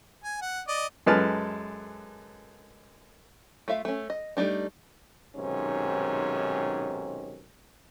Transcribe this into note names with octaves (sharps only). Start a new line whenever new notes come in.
G#5
F#5
D5 D#5
F#2 G#3 A4 B4 A5 F6
A3 F4 E5 F5
A3 C#4
D#5
G3 A3 D4 D#4
B1 G#2 C3 D#3 C#4